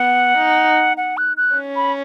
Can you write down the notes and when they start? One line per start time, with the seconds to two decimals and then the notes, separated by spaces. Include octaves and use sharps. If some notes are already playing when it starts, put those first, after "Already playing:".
Already playing: B3 F#5
0.38 D#4
0.97 F#5
1.17 F#6
1.37 F#6
1.56 C#4
1.76 B5